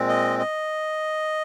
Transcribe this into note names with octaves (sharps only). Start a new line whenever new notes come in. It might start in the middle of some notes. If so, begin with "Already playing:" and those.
Already playing: A#2 G#3 C4
D#5
D#5